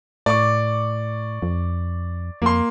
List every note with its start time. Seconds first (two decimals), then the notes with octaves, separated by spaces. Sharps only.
0.26 A2 D5 C#6 D6
1.42 F2
2.42 F2 A#3 C6